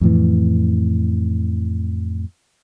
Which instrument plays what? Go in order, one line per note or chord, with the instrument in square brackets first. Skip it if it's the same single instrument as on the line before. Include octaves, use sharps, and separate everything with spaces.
[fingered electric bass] F2 A2 E3